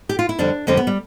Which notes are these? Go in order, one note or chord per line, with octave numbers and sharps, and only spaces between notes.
G4
F4
E4
F2 D3 G3 D4
F2 D3 G3 C4
B3
G3